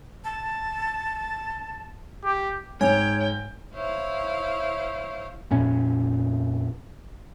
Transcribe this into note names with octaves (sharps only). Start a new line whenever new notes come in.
A5
G4
G#2 C#5 G5 G#5
E4 C5 C#5 F5
F2 A#2 C#4